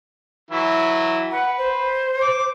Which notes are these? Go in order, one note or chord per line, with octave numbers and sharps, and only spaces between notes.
E3 F#3 E4
B4 F#5
C5
D6